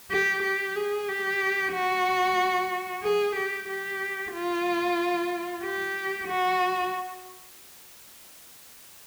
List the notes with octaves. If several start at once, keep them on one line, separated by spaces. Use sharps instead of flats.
G4
G4
G#4
G4
F#4
G#4
G4
G4
F4
G4
F#4